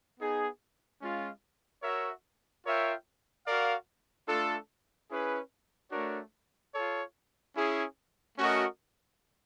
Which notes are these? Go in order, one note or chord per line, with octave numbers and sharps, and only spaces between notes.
B3 D#4 G#4
G#3 C#4 F4
F#4 A#4 C#5 E5
F4 A#4 C#5 E5 G5
F#4 A#4 D5 F5
A3 D4 F4 A4
C#4 E4 G#4 B4
A3 D4 F#4 A#4 C#5
F4 A4 C#5
C#4 E4 G#4
A3 C#4 F#4 A#4 D#5